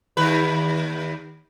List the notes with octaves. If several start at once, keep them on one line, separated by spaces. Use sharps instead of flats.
D#2 B4